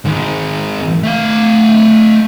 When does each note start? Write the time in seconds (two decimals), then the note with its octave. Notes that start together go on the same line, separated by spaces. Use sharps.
0.05 G#2 D#3
1.03 A3 F5